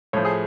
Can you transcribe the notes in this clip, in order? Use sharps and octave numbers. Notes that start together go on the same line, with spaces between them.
A2 F3 C#5
G#4